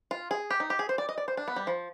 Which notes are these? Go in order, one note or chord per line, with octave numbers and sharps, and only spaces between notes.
F4
G#4
G4
D#4
G4
G#4
C5
D5
D#5
D5
C5
D4
B3
G3
F3